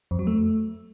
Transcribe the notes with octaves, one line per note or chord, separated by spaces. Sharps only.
F2
F#3
A3